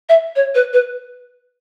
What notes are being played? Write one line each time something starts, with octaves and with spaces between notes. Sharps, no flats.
E5
C#5
B4
B4